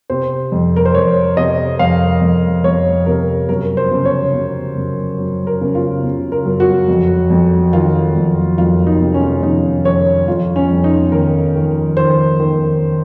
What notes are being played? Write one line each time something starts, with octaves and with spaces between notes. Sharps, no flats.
C3 C5
F2
A#4
C5
F2 C#5
C3 D#5
F2 F5
F2
F2 C#5
C3 A#4
F#2 A#4
C5
C#3
C#5
C#3
F#2
F#2
A#4
C#3
F4
C#3
A#4
F#2
F#4
F2
F2
D#3 F4
F2
F2 F4
D#4
C3
C#4
F2 D#4
F2 C#5
F2 F4
C#4
F2
D#4
D#3 A#4
D#3
D#3 C5
D#3